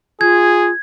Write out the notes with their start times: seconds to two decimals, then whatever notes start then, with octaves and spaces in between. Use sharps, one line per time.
0.21 F4 G#4 G#6